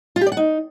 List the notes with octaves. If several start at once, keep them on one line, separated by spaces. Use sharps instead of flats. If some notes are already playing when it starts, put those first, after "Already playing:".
F4
G4
D5
F#5
D#4